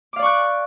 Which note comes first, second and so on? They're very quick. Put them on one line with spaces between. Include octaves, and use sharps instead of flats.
D6 F5 D5 C#6 F#6